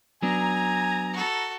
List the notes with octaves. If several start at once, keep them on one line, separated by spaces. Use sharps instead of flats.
F#3 B3 D4 G#5 A#5
F#4 A4